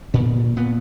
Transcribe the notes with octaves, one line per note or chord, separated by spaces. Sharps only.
A#2 B3
A#2 B3